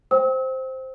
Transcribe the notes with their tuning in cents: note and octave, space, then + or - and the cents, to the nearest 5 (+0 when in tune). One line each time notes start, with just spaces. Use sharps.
C5 +0 G5 +0 E6 -40